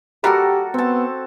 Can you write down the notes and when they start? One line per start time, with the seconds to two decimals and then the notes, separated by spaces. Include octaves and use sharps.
0.24 G3 A#3 F#4 G4 A4 A#4
0.74 B3 C4 A5